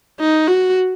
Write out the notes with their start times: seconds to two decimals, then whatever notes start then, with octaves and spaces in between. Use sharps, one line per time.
0.20 D#4
0.48 F#4